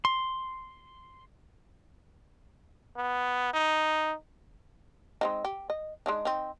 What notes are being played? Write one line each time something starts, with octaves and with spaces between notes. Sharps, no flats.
C6
B3
D#4
G#3 C4 D#4
G4
D#5
G#3 D4 D#4
C4 D#4